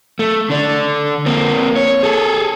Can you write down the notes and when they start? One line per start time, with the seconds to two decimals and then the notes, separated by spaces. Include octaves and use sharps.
0.19 A3
0.50 D3 D4
1.26 A#3 C4
1.76 C#5
2.03 G#4 A4